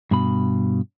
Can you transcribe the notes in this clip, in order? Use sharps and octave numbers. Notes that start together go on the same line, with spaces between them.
G2 B2 B5